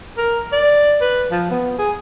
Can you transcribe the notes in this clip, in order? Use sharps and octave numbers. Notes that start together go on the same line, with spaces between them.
A#4
D5
B4
F3
B3
G#4